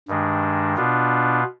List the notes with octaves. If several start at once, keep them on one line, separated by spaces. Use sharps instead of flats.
G2 D#3 G#3 D4
B2 B3 D4 F4